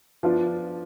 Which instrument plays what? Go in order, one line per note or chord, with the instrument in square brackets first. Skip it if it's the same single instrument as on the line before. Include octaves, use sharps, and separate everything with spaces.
[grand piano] F3 B3 D4 F4